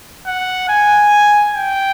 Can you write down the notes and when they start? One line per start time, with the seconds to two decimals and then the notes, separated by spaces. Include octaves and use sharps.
0.27 F#5
0.69 G#5
1.54 G5